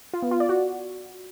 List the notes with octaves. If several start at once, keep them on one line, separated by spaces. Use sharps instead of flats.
F4
B3
F4
D5
F#4